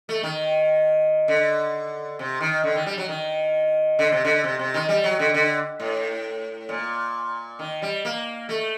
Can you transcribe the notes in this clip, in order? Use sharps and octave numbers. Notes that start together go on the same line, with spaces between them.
A3
D#3
D3
C3
D#3
D3
D#3
G3
F#3
D#3
D3
C3
D3
C3
C3
D#3
G3
F#3
D3
D3
A2
A#2
D#3
G3
A#3
A3